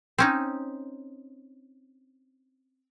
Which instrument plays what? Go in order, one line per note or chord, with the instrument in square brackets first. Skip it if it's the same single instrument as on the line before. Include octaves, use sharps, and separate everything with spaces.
[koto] C4 C#4 D#4